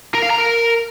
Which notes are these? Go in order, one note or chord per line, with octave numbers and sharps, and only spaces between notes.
A#4
F5
A#5
A#4